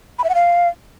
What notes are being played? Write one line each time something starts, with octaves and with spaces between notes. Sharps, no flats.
B5
E5
F#5
F5